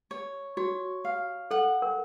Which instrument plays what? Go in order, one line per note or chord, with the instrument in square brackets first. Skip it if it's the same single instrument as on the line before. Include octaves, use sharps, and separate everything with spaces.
[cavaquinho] C#5
[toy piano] F#4 [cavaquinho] C#5
[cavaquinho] F5
[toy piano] A4 [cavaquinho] F#5
[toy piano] A#4